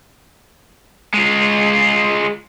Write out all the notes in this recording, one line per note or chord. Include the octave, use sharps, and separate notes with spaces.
G#3 F4